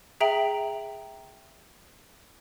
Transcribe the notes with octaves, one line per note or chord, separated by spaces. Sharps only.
G#4 E5 G5 A#5 D7 F#7